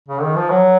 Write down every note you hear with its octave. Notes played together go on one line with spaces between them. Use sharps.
C#3
D#3
F3
F#3